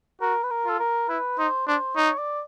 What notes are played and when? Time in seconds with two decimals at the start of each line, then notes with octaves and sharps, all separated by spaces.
0.21 F#4 A#4
0.43 B4
0.51 A#4
0.65 F4 A4
0.79 A#4
1.09 E4 B4
1.38 D#4 C5
1.68 D4 C5
1.96 D#4 C#5
2.19 D5